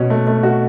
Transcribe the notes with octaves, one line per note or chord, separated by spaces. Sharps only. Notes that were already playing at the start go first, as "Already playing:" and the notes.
Already playing: B2 C#4 F#4
A3
A3
F#4